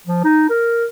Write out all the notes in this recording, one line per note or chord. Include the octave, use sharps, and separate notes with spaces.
F3
D#4
A#4